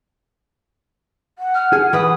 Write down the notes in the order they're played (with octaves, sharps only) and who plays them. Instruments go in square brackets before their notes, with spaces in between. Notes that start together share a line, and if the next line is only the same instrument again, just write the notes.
[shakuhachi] F#5
[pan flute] F6
[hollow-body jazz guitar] G#4 [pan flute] F6
[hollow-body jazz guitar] E3 B4 [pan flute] D#6